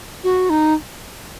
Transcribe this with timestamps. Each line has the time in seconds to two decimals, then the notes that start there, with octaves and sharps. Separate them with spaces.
0.24 F#4
0.50 D#4